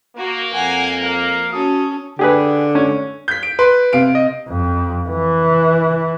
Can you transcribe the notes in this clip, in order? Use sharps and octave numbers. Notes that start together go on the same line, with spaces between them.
A#3 F#4
F2 F#5 G#5
A#4 F5
C#4 F#4 A4 D#6
D3 G4 G#4 B4
C#4
G6 B6
D7
B4 C6
C3 F5 D7
D#5
F2
E3